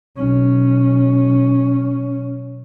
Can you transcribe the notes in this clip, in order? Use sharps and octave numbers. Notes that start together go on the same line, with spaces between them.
B1 C#4